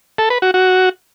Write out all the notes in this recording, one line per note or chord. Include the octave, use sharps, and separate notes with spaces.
A4
B4
F#4
F#4